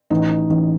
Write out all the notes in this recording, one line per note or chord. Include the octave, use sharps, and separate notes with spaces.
A1 D#4
A1